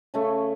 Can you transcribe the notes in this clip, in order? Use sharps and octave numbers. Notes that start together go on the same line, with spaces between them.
C#3 A3 C#4